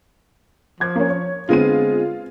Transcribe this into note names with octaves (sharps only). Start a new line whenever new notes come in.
F3 D6 G#6
A#3 C#4
C#5
D3 G#3 B3 C4 F4 D#7